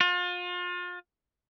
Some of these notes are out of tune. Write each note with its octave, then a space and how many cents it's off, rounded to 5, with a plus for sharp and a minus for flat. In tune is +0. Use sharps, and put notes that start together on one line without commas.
F4 +35